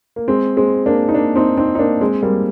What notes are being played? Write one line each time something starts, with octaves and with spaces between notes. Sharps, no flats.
A#3
G#3 C4
G#3 C4
A#3 D4
D#4
A#3 D4
C4 D#4
C4 D#4
D#4
A#3 D4
G#3 C4
G3 A#3